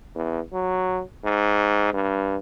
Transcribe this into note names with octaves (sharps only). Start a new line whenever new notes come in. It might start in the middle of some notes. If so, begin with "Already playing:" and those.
E2
F#3
G#2
G2